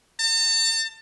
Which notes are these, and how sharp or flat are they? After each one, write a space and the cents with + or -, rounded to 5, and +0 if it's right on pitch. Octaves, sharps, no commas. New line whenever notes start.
A5 +40